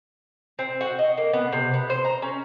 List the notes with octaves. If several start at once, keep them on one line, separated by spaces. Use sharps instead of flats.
C4
F#4
D#5
A#3
B3
C3
B3
C5
A#5
C#4